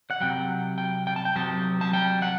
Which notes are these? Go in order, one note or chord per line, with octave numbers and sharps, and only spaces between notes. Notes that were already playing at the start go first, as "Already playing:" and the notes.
F#5
C3 F#3 G5
G5
G5
A5
G5
C3 F#3 A5
A5
G5
F#5